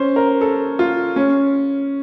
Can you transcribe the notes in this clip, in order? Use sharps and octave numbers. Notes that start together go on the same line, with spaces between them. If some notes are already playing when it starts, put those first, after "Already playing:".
Already playing: C#4 C5
A#4
A4
F4
C#4